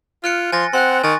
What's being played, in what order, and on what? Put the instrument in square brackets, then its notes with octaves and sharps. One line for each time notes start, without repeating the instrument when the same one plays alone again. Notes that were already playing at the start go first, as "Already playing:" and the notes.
[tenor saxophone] F4 [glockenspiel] F6 F#6 C#7
[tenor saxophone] F3 [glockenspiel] G#5 A6 A#6 [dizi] C6
[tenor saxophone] C4 [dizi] F#5 [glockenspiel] C6 F#6
[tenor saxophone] D#3 [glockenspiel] G#5 A6 [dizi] C#6